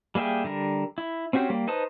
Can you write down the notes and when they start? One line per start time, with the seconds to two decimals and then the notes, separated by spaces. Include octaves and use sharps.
0.15 G3 A#3 G#4 E5 G5
0.44 D3 G3 A#4
0.98 E4
1.33 C4 C#4 F#4 G4 C5
1.50 G3 A#3
1.68 D#4 B4 C5 A5 D#6